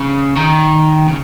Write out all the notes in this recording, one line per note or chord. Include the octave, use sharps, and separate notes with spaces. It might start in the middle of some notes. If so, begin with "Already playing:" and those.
Already playing: C#3
D#3
C#3